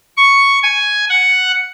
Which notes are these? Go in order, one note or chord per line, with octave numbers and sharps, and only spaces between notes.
C#6
G#5
F#5